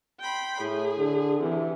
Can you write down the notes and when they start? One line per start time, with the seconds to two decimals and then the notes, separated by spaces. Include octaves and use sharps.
0.19 G5 B5 C6
0.60 A2 G#4
0.97 D3
1.40 C3 E3